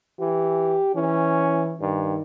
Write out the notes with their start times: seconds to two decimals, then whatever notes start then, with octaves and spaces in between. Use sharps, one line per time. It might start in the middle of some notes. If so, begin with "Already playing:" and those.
0.20 E3 G4
0.95 E3 C#4
1.81 G2 D#3